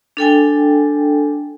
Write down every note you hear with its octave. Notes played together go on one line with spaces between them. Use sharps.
D4 A4 G5 G#5